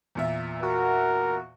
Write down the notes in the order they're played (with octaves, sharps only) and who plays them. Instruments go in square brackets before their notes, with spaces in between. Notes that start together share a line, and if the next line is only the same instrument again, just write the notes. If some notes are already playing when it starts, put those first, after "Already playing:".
[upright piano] E2 A#2 E5
[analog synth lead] F#4 [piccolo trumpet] A#4